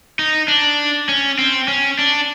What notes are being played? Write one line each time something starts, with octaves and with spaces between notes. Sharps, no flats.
D#4
D4
C#4
C4
C#4
D4